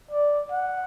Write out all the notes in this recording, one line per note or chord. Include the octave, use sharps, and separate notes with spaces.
D5
F#5